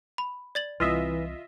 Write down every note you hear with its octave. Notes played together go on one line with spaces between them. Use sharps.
B5
D5 A6 F#7
C2 E3 C4 F4 D#5 E5